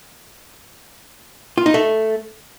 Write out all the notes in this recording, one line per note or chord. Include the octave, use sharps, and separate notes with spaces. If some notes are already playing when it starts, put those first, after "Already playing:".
F4
D#4
A3